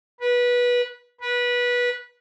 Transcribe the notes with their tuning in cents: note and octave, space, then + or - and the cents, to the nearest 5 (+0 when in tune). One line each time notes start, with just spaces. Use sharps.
B4 -20
B4 -20